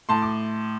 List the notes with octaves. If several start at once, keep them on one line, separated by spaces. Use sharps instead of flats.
A2 A5 C6
D6